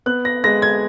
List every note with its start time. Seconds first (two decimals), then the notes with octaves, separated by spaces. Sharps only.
0.06 B3 F#6
0.25 A#6
0.44 G#3 A#6
0.62 G#6